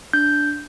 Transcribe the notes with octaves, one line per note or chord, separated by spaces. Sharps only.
D4 G6